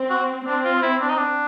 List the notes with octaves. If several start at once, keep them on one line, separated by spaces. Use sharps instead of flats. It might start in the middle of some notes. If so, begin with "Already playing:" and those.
Already playing: C4
F#4
C4 D4
F4
E4
D4
D#4
D4